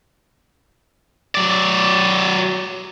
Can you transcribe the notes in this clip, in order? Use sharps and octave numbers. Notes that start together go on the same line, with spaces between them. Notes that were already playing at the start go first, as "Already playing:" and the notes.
F#3 D5